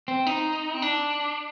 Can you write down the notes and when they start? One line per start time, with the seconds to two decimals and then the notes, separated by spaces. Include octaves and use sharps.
0.08 C4
0.27 D#4
0.74 C4
0.82 D4